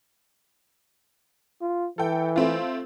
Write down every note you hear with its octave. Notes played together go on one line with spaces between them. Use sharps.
F4
E3 A4 G5
A3 C4 F4